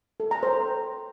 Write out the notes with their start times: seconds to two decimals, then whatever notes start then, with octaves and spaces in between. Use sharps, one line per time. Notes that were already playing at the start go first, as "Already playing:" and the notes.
0.20 A4
0.31 A#5
0.43 C5